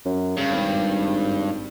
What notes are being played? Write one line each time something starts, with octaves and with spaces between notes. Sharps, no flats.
F#2
G2 C#3
G#1